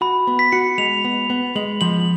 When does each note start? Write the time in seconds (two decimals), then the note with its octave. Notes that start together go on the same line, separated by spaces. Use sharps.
0.01 F#4 B5
0.27 B3
0.39 B6
0.52 F#4 C#7
0.78 G#3 F7
1.05 B3
1.30 B3
1.55 G#3 F#7
1.81 F3 F#7